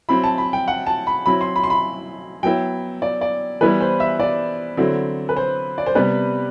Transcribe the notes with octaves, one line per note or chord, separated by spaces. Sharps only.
F#3 C4 E4 B5
A5
B5
G5
F#5
A5
B5
F#3 C4 E4 B5
C6
B5
C6
B5
F#3 B3 E4 G5
D5
D5
E3 G3 B3 E4 B4
C5
E5
D5
D3 F#3 C4 E4
B4
C5
D5
C5
C3 G3 B3 B4